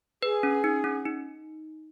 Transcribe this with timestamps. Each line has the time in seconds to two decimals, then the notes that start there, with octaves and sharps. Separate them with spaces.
0.22 G#4 B4
0.43 C#4
0.64 D#4
0.84 C#4
1.06 D#4